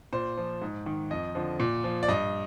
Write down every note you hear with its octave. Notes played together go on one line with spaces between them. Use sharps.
A#2 C5
F3
G#2
D#3
F2 D#5
D3 F3
A#2
F3
D5
G2 D#5